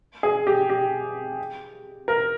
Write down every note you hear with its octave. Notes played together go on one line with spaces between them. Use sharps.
G#4
G4
G4
A#4